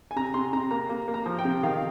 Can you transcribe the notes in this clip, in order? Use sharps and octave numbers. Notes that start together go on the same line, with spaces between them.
G#5
C3 A#5
C3 C6
C3 A#5
A#3 A#5
A#3
A#3
A#5
F3
G5
C3
D#3 F5